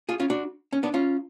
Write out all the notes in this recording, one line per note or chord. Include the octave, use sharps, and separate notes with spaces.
F4 G#4
C#4 F4
D4 F#4
C#4
B3 D4
C#4 F4